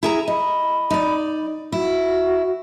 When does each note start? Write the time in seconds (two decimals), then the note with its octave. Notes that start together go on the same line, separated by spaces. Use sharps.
0.03 E4 G#4 A#5
0.28 D#5 B5
0.90 D#4 D5
1.72 E4 F#4